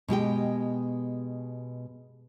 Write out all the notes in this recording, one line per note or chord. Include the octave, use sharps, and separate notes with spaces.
B2 G#3 G4 G5